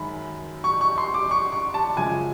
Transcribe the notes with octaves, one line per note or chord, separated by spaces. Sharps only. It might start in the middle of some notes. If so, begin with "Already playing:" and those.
Already playing: F#2 D#3 G#3 B5
C#6
C#6
C6
D6
C#6
C#6
A5
F#2 C#3 F3 G#3 G#5